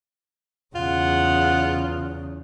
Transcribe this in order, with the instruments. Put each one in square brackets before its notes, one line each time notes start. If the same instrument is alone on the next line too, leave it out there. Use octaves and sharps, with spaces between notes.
[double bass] E2 C#3 [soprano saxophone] F4 [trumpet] F#5